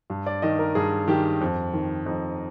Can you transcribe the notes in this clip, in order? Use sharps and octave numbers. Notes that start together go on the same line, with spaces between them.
G2
D5
D#3 D#5
A#4
G2 G#4
D#3 G4
F2
D#3
F2 D#4